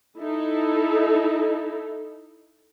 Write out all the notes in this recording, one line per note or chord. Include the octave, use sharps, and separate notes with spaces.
D#4 E4 A4